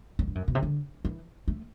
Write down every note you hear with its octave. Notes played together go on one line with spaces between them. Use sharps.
F#2
G2
F#2
B2
C3
D3
E3
A3